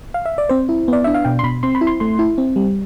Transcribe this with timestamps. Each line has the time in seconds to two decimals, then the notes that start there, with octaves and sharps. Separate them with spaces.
0.14 F5
0.26 E5
0.38 D5
0.49 C4 C5
0.69 E4
0.88 B3 D5
1.04 D4 E5
1.14 F5
1.25 B2 G5
1.39 C6
1.43 B2 B5
1.63 C4 C6
1.75 B5
1.81 E4
1.87 C6
2.00 A3 C6
2.19 E4
2.38 C4
2.56 G3